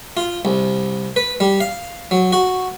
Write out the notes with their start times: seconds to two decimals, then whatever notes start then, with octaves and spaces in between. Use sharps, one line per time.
0.17 F4
0.45 C2
1.16 B4
1.40 G3
1.61 F5
2.11 F#3
2.33 F#4